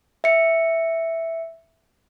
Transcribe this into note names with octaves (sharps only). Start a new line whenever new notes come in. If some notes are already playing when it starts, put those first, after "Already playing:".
E5 C#7